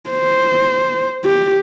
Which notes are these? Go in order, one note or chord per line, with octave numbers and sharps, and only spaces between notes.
C5
G4